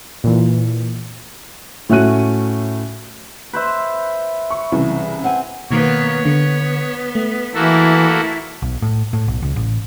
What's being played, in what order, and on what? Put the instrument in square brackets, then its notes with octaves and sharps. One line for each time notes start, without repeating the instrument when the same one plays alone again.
[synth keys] A#2 E3
[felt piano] A2 A3 C#4 F#4 F#6 D#7
[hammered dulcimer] B4 C5 E5
[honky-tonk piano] C#6
C2 C#3 E3
[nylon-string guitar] C4 F#5 G#5
[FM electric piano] B2 D#3 [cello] A#3 B3 [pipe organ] C#5
[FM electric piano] D3 [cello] B3
[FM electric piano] A3
[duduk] E3 [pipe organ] A#3 F#4 A4 [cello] E4
[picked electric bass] B1
A2
A2
B1
C#2
A1